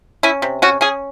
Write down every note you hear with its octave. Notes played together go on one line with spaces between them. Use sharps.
C#4 E4
C3
C#4 F#4
C#4 G#4